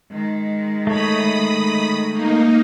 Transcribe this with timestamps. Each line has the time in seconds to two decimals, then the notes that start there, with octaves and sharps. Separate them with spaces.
0.11 D#3 G#3
0.87 A3 C#5 B5 D#6
2.12 A#3 D#4